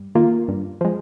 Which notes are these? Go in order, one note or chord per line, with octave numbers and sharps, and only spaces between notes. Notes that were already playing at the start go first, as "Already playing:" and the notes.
Already playing: G2
D#3 A#3 F4
G2
F3 G#3